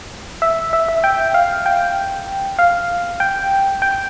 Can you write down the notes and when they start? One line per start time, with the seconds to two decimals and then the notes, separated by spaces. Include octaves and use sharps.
0.42 E5
0.73 E5
0.88 E5
1.04 G5
1.34 F5
1.66 G5
2.59 F5
3.20 G5
3.82 G5